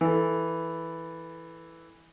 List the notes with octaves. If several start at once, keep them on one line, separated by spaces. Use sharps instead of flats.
E3 A4